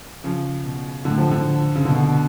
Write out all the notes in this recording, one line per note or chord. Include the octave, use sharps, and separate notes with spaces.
C#3 F3
B2
A2 D3
F3
D3
C#3
B2 D3